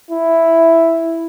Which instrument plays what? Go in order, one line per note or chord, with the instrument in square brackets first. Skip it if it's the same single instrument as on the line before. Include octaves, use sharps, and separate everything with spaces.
[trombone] E4